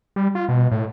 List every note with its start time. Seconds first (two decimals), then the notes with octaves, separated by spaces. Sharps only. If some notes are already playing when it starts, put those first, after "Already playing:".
0.16 G3
0.35 F4
0.49 B2
0.71 A2